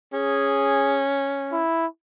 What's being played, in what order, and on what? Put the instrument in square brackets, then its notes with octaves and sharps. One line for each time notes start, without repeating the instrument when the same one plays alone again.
[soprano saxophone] C#4 [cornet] G#4
[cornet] E4